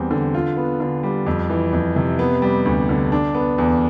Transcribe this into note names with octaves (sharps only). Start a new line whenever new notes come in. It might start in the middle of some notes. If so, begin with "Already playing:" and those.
Already playing: E2 G3 C4
D3
F4
B3
D3
G3
F2
E3
F2
C3
B3
G3
D2
D3
D4
B3
E2